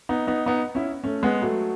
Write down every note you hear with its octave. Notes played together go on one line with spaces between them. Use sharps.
B3 D#4
B3 D#4
B3 D#4
C#4 E4
A3 C#4
G#3 B3
F#3 A3